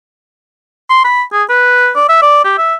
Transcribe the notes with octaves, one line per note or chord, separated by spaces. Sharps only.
C6
B5
G#4
B4
D5
E5
D5
G4
E5